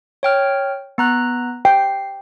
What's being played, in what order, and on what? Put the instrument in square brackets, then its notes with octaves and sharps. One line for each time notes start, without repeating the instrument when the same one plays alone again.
[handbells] C#5 G5 F6
B3 A#5 F#6
[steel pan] G5 [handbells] C7